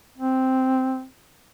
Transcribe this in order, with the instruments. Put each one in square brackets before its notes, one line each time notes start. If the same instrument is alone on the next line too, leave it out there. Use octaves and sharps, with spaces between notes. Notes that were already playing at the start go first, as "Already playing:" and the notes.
[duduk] C4